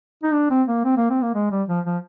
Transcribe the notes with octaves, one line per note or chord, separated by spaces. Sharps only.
D#4
D4
C4
A#3
C4
A#3
C4
A#3
G#3
G3
F3
F3